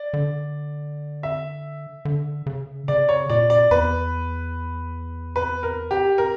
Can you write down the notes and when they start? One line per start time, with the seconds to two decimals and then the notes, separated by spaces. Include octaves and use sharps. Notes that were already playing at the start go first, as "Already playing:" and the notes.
Already playing: D5
0.14 D3
1.23 E5
2.05 D3
2.46 C#3
2.88 C#3 D5
3.09 C#5
3.30 A#2 D5
3.50 D5
3.71 E2 B4
5.36 B4
5.63 A#4
5.91 G4
6.18 A#4